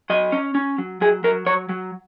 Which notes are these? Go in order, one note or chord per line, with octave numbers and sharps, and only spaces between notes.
F#3 D#5
C#4
C#4
F#3
F#3 G#4
F#3 A#4
F#3 C#5
F#3